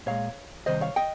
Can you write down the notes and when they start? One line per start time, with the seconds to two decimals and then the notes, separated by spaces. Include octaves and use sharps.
0.06 A#2 G#3 C#5 F5
0.66 C3 D#3 G3 C5 D#5
0.81 C#5 F5
0.96 D#5 G5